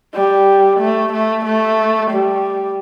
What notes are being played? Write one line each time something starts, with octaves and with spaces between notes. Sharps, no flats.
G3
A3
A3
A3
G3